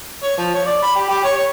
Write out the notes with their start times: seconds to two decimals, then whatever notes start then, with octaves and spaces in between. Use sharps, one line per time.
0.23 C#5
0.37 F3
0.54 C#5
0.66 D5
0.82 B5
0.95 G4
1.09 G4
1.24 C#5
1.36 C#5